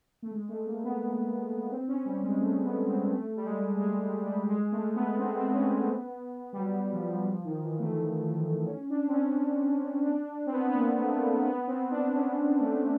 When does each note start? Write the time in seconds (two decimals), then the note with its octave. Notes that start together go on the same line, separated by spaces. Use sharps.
0.22 A3
0.31 G#3
0.49 A3
0.67 A#3
0.84 B3
1.71 C4
1.88 C#4
2.06 G3
2.23 G#3
2.40 A3
2.64 B3
2.87 C4
3.10 A3
3.36 G3
3.45 G#3
3.79 G#3
4.03 G3
4.26 G3
4.38 G3
4.49 G#3
4.72 A3
4.95 B3
5.19 C4
5.36 C4
5.53 C#4
5.71 B3
6.53 G3
6.58 F#3
6.93 F3
7.27 F3
7.44 D#3
7.62 E3
7.79 A3
8.66 C#4
8.90 D4
9.08 C4
9.13 C#4
10.06 D4
10.46 C4
10.52 B3
10.69 B3
10.75 A#3
10.98 A3
11.13 A3
11.21 A#3
11.44 B3
11.68 C4
11.91 D4
12.14 C#4
12.37 B3
12.60 A3